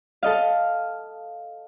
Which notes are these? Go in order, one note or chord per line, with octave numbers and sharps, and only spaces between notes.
A4 D#5 F5